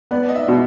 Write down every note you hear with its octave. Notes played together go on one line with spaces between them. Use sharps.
B3 D5
D#5
E5
B2